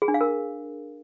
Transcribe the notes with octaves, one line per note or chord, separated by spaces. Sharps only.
G#4
D4
F5
A#4